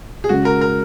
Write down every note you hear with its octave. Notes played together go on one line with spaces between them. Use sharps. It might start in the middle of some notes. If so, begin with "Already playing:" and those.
G#4
C#3 G#3 C#4 F#4
A#4
A#4